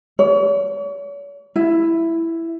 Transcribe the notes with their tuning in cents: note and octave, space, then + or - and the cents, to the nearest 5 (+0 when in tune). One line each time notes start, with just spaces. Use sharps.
C#5 +40
E4 +5